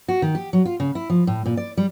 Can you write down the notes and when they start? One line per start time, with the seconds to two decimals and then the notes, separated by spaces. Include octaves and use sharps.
0.08 F#4
0.22 D#3
0.35 G4
0.53 F#3
0.65 F4
0.80 C#3
0.95 E4
1.10 F3
1.27 A2
1.46 A#2
1.57 D5
1.77 G3